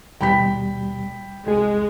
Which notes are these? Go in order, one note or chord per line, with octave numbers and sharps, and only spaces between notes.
D#2 B2 G3 G5 B5 B6
C2 F2 G#3 G#4